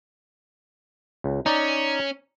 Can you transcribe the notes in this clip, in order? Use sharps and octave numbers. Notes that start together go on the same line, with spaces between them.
C#2
C#4 D#4 D5